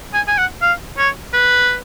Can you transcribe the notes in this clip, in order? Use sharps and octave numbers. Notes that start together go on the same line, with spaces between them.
G#5
G#5
F#5
F5
C#5
B4